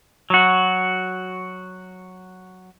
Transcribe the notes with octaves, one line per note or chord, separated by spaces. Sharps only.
F#3 F#4